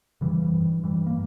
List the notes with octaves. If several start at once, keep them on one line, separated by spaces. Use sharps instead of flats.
F2 C#3 E3 G3
G2
G2 E3 G3
A#3